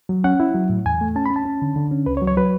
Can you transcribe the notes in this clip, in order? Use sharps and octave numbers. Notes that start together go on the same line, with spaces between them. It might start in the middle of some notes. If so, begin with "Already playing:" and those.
F#3
C#4 F#5
E4
F#3
A2
E2 G#5
A3
C#4 A5
B5
C#4
A5
C#4
D3
D3
C#4
C#2 B4
C#5
F#3
C#5
F#3 B4